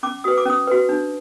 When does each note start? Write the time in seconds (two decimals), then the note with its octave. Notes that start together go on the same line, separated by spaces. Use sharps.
0.03 C#4 D6
0.24 F#4 B4 D#6
0.38 D6
0.45 C#4 D#6
0.67 F#4 B4
0.89 D4